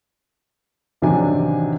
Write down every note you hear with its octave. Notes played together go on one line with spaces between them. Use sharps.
A1 C3 D#3 F#3 D4 G#5